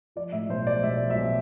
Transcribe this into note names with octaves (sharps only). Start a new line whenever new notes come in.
F3 D5
A2 E5
B1 C5
F3 D5
B1 E5
F3 D5
E5
B1